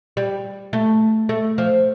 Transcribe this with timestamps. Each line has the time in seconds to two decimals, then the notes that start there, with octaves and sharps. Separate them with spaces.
0.17 G3
0.73 A3
1.29 A3
1.58 F3